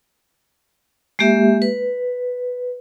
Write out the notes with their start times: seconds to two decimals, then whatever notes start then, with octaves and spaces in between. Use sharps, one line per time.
1.19 G#3 A#3 G4 E5
1.62 B4